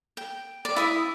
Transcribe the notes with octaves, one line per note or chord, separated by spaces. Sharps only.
G5
D5
E4 E5 D#6